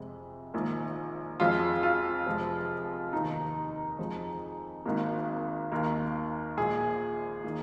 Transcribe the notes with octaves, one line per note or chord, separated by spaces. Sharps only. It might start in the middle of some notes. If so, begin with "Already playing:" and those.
Already playing: F2 C3 G#3
A#1 G#2 D#3 A#3
F2 F3 G#3 F4
F4
F1 F2 F3 G#3
F1 D#2 D#3 D#4
F2 F3 G#3
G#1 G#2 D#3 A#3
D#2 D#3 A#3
A#1 A#2 G#3 G#4
D#3 A#3